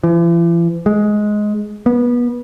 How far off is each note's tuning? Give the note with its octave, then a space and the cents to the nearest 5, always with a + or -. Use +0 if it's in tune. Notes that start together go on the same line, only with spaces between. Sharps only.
E3 +45
G#3 +10
B3 -25